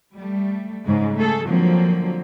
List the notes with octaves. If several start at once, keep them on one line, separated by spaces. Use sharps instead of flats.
G3 A3
G#2 C#3 G#3
A3 G#4 A4
D3 F3 F#3 A#3 C4